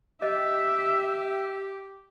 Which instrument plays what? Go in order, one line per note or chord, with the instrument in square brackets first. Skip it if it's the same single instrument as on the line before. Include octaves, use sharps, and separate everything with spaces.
[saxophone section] G4 [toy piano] D#5 [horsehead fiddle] E5